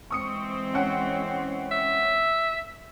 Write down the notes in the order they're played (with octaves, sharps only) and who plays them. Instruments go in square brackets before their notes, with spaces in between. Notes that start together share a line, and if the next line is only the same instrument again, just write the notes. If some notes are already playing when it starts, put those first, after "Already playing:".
[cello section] E3 G#3 C4 [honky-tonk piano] C#6 D#6 C#7
[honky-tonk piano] C#4 F#5 G5
[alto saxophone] E5